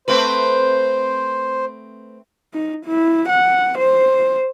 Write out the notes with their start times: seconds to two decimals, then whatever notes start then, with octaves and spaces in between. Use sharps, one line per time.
0.08 A3 C4 B4 C5
2.53 D#4
2.85 E4
3.29 F#5
3.78 C5